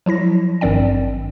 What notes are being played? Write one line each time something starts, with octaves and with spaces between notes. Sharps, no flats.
F3 F#3 E4 A#6
G#1 G2 D#3 C4 D5 G5